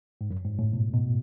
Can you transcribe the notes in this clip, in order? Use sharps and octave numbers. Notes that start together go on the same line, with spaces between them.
G#2
F#2
G#2
A2
B2
B2